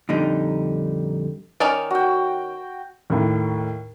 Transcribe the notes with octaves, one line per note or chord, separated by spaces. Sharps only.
F2 A#2 D3 G3 D#4
D#3 C#4 D5
F#4 G5
D#2 A2